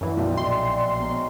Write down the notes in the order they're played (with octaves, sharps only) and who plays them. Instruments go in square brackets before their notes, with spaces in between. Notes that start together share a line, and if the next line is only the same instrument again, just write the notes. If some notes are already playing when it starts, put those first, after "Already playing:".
[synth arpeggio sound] F#2 E3 [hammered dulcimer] D3 A3
[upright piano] B1 [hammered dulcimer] D#3 C4 D4
[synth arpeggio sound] A#1 C6 [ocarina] D5
[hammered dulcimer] G#3 A#4 C#5 [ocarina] B3